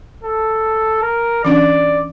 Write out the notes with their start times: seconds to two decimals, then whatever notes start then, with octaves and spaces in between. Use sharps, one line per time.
0.24 A4
1.03 A#4
1.45 E3 C#4 D4 D5